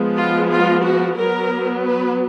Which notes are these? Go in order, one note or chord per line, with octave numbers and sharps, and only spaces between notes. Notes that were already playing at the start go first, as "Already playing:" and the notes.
Already playing: F3 G#3 B3
F4
F4
F#4
F#3 B3 A#4
B4